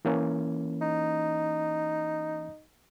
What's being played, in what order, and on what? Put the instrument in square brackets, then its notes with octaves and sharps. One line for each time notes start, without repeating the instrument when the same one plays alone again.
[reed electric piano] E3 A#3 C#4
[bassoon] D#4